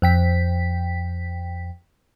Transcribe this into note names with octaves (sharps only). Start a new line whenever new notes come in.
F2 G5 B6